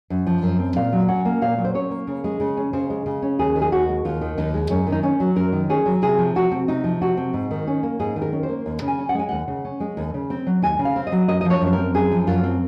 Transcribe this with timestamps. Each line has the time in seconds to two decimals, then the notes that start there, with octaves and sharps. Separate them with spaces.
0.10 F#2
0.27 F3
0.43 F#2
0.59 C4
0.76 A#2 F5
0.92 F#3
1.08 C#4 F#5
1.25 A#3
1.42 A#2 F5
1.58 F#3
1.65 C5
1.74 C#4 C#5
1.91 A#3
2.07 C#3
2.24 G#3
2.40 C#3
2.57 C#4
2.73 C#3 C5
2.90 G#3
3.06 C#3
3.22 C#4
3.39 D#2 G#4
3.56 D#3
3.62 G#4
3.72 D#2 F#4
3.89 G#3
4.05 D#2 F4
4.21 D#3
4.38 D#2 D#4
4.54 G#3
4.70 F#2 C#4
4.87 D#3
4.92 D#4
5.03 C#4
5.20 F#3
5.36 F#2 A#4
5.52 D#3
5.70 C#4 G#4
5.86 F#3
6.02 C3 G#4
6.18 F3
6.35 C3 F#4
6.51 C4
6.68 C3 D#4
6.84 F3
7.01 C3 F#4
7.17 C4
7.33 G#2
7.51 D#3
7.67 C#4
7.83 A#3
8.00 G#2 G#4
8.16 D#3
8.22 A#4
8.33 C#4
8.43 C5
8.49 A#3
8.66 D#2
8.82 C#3
8.88 G#5
8.99 C#4
9.09 F#5
9.15 G#3 G#5
9.29 D#2 F#5
9.48 C#3
9.65 C#4
9.80 G#3
9.97 D#2
10.14 C#3
10.30 C4
10.47 F#3
10.62 D#2 G#5
10.79 C#3
10.85 F5
10.96 C4
11.07 D#5
11.12 F#3
11.28 F#2 D#5
11.41 D#5
11.45 F3
11.50 C#5
11.61 F#2
11.67 C5
11.73 A#4
11.78 C4
11.94 F#2 G#4
12.11 F3
12.27 F#2 F4
12.43 C4